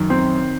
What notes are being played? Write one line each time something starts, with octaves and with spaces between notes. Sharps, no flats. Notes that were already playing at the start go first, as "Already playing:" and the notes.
Already playing: F#2 D#3
C4